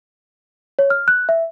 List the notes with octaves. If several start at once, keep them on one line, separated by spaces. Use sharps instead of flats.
C#5
F6
F#6
E5